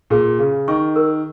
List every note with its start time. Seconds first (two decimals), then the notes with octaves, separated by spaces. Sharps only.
0.10 A#2 G#4
0.39 C#3 G#4
0.68 D#3 C#6
0.96 A#4